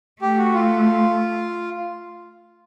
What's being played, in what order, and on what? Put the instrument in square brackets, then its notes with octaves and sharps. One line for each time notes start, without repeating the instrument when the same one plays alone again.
[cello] A3 [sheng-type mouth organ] G4
[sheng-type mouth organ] F#4
F4